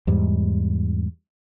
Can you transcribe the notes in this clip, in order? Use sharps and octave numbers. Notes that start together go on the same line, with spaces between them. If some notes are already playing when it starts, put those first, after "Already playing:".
E2 G#2 G3